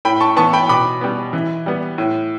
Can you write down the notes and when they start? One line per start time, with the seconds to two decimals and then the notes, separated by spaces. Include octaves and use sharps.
0.05 A2 G5 B5
0.20 A5 C#6
0.36 E3 B3 A5 C#6
0.53 G5 B5
0.69 B2 B5 D6
1.01 G3 B3
1.33 E3
1.66 G3 B3
1.98 A2